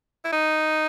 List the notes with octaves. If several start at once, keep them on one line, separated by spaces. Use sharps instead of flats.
E4
D#4